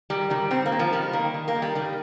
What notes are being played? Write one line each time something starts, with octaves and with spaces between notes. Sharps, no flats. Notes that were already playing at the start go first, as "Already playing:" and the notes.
D#3 G3
D#3 G3
D#3 C4
A#3
D#3
F3
D#3 G3
D#3 A#3
D#3
A#3
D#3
G3
D#3 G3